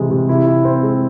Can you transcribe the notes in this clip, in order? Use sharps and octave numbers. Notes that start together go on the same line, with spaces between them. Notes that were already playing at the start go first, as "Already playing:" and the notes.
Already playing: C3 E3 G#3
C3
E4
E4
C4
G#3